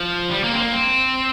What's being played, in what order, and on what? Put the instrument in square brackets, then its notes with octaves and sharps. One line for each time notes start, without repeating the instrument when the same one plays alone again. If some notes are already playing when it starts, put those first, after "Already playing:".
Already playing: [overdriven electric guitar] F3
G3
A#3
C4
A#3
C4